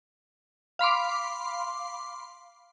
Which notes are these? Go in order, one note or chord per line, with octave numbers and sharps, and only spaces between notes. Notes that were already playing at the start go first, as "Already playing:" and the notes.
F5 B5 C6 D6